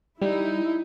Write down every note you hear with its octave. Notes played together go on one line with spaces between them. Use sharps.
G3 D#4 E4